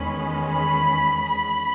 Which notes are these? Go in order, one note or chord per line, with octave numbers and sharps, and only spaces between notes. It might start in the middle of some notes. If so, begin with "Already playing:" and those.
Already playing: E2 D#3 G#3 C#4 B5
B5
B5